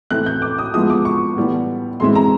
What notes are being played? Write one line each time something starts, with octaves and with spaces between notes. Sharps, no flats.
A2 E3 A3 C4 E4 F#6
G6
D6
D#6
F3 G#3 B3 E4 D#6
D6
C#6
A2 E3 G3 B3
A2 E3 G#3 C4 E4 C6
A#5